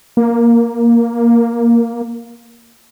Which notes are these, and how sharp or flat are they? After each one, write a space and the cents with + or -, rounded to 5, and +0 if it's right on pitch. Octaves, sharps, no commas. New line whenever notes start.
A#3 +5